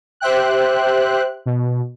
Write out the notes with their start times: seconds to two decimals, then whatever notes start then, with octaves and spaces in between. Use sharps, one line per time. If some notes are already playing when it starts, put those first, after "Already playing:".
0.20 G4 C5 E5 G5 F#6
1.46 B2